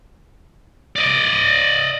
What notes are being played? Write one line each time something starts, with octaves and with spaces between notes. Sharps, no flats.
D5 D#5